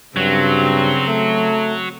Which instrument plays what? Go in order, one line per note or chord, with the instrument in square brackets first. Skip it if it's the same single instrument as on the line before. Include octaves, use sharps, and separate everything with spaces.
[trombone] G2 [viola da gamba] C#3 C4 [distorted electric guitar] F#3
[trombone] A3